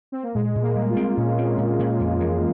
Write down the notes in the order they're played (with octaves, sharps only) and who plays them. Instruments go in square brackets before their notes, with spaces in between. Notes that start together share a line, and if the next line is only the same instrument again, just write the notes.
[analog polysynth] C4
A#3
[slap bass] A#2 [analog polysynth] G#3
[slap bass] A#2
[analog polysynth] A#3
[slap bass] G3
[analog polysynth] F4
[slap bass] C4
[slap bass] A#2 [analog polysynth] C#4
[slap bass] C4 [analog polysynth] C#4
[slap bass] A#2 [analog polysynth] C#4
[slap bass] A#2 [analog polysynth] C#4
[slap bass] F2
E3